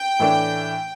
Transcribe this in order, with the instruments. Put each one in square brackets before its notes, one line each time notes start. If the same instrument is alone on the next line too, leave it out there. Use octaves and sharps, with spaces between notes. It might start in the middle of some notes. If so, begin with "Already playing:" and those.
Already playing: [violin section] G5
[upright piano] A2 E3 A3 D4